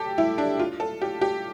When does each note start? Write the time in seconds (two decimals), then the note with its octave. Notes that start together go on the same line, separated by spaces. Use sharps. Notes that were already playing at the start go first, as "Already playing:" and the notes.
Already playing: G4 A4
0.18 E4
0.38 D4
0.59 F4
0.80 A4
1.02 G4
1.21 G4